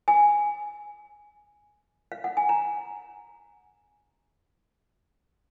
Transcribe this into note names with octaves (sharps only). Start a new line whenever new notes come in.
G#5
F5
F#5
G#5
A#5